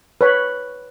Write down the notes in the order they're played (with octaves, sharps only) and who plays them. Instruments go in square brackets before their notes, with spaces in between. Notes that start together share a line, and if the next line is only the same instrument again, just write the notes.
[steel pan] B4 C#5 B5